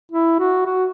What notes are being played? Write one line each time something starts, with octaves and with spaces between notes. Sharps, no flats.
E4
F#4
F#4